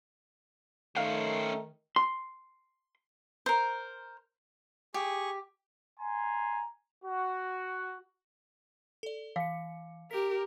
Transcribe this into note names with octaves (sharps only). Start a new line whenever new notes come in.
D#3 A3 C#4 C5 F5
C6
A#4 C5
G4 G#4 C#6
G#5 A#5 C6
F#4
A4 D5
E3 F5 C#7
G4 A#4 B6